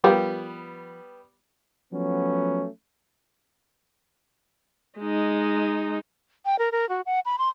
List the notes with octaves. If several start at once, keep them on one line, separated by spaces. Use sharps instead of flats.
F3 G3 B3 G4 A#4
F3 F#3 A3 B3 C#4
G#3 D#4
G5
A#4
A#4
F#4
F#5
B5
C6